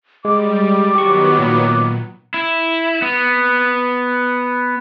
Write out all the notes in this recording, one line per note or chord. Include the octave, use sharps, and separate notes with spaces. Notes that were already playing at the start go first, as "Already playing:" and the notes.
G3 G#3 D6
D#3 F#3 B3 G4 C#6
A#2
E4
B3